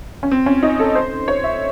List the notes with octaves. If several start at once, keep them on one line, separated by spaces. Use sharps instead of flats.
C#4
C4
C#4
D#4
A4
C5
C#5
E5